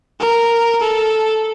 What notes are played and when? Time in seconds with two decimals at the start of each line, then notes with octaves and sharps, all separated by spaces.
0.20 A#4
0.81 A4